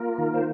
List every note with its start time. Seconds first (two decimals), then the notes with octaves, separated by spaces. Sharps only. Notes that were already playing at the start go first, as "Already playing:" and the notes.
Already playing: A#3 F4 A#4
0.18 D#3
0.34 C5